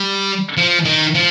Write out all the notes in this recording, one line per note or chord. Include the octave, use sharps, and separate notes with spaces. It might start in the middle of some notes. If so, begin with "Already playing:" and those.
Already playing: G3
F3
D#3
F3